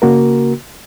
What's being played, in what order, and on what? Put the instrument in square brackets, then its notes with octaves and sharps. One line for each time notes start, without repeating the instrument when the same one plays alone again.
[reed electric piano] C#3 A#3 F#4 A#4